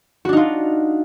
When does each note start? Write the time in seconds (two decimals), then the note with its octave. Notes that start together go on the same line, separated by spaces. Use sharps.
0.25 F#4
0.29 D4
0.33 D#4
0.37 F4